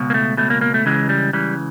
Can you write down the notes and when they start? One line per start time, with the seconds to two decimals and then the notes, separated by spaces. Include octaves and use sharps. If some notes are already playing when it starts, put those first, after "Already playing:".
Already playing: C#2 B2
0.10 A#3
0.14 A3
0.37 C#2 B2 A3
0.50 A#3
0.61 A#3
0.74 A3
0.85 C#2 C#3 E3 G#3
1.09 G3
1.33 C#2 C#3 E3 G3